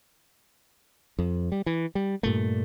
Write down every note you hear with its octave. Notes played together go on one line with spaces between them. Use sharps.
F2
G3
E3
G3
G2 A#2 A3